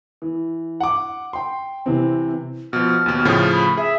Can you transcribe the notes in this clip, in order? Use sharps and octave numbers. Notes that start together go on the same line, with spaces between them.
E3
F#5 D6
G5 C6
C3 E3 C4
B2 F3 F6
D#2 B2
A2 C#3 F3
B5
G#4 E5